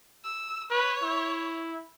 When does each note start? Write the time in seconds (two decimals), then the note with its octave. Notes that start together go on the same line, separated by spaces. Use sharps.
0.24 E6
0.71 B4 C#5
1.03 E4